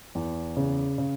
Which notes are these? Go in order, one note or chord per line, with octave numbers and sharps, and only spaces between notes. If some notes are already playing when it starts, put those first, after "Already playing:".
E2
C#3
C#3